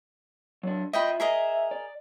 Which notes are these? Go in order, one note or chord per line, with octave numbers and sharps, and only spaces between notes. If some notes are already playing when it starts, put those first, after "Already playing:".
F#3 D4
F4 D#5 E5 G5 B5
G#4 A#4 D#5 E5
D5